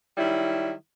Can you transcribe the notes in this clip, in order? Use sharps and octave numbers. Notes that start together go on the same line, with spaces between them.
D#3 F#3 G3 E4